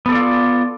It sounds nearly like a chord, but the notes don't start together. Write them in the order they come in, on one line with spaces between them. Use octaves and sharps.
B3 A4 D5 F4